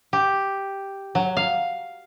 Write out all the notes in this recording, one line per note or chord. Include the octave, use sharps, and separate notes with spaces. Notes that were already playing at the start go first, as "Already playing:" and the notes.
G4
F#3
F5